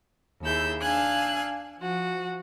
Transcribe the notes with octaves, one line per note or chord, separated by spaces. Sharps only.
D#2 E4 G#4 E6 G6
D4 F5 G#5 E6 F#6 G#6
F3 F#4